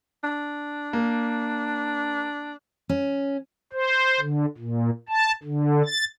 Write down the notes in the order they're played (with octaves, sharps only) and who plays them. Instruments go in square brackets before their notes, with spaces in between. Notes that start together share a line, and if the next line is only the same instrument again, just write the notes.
[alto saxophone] D4
[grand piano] A#3
[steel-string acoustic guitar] C#4
[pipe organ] C5
D3
A#2
A5
D3
A6